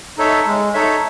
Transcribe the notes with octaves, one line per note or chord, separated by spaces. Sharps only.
D#4 A4 C#5 E5
G#3
D#4 A4 C#5 E5